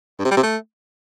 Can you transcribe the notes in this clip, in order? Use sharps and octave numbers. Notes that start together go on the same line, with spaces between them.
G2
C3
G3
C3
A3